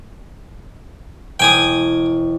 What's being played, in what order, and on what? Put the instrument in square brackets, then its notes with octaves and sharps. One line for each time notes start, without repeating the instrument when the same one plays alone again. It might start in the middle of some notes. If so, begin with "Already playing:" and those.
[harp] E1 [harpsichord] G5 G#5 D#6